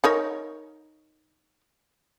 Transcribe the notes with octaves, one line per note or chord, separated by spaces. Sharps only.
D#4 A#4 C#5